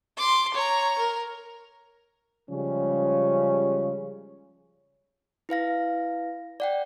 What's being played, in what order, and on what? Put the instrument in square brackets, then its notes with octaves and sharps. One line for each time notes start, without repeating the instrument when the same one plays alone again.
[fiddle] C6 D6
C#5 A#5
A#4
[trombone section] C#3 F3 G3 G#3 C#4
[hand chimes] E4 B4 F5 A#6
D5 F#5 G5